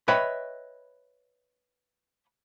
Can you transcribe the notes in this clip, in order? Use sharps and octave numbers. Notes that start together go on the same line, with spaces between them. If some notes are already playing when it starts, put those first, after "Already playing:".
B4 C#5 D#5 E5 G5 B5